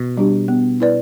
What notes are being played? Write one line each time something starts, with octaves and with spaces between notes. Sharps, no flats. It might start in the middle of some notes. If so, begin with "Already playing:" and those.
Already playing: B2
G3 D4 G4
B3
E4 B4 D5